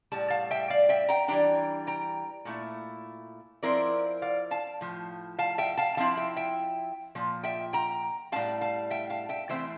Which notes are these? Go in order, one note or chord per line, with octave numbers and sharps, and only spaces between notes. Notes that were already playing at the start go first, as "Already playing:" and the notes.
A2 G3 A5
F5 A5
E5 G5
D5 F5
E5 G5
G5 A#5
E3 G3 D4 G5 A#5
G5 A#5
A#2 A3 E4
F3 C4 E4 A#4 D5
D5 F5
F5 A5
A2 F3
F5 A5
E5 G5
F5 A5
F3 C4 E4 F5 A5
E5 G5
E5 G5
A#2 F3
E5 G5
G5 A#5
A2 G3 C4 F5 A5
F5 A5
E5 G5
F5 A5
E5 G5
E3 A3 C4 C5 E5